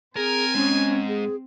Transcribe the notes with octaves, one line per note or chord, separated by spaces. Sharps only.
C4 G#4 A#4 G#5
G#2 C#4
G#4